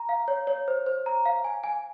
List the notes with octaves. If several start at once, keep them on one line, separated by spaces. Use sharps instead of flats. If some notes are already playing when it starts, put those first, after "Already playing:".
Already playing: A#5
F5
C#5
C#5
C5
C5
A#5
F5
G#5
G#5